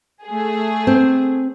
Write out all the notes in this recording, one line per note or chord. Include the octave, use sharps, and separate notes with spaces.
A3 G#4
C4